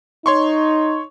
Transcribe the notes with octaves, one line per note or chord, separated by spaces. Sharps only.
D#4 C#5 C6 C#6